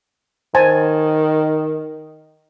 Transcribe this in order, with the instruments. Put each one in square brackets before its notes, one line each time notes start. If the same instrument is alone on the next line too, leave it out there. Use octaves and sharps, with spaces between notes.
[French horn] D#3 [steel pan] C5 G#5 A5